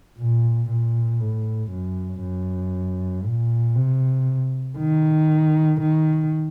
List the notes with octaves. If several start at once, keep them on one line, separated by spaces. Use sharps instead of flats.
A#2
A#2
A2
F#2
F#2
A#2
C3
D#3
D#3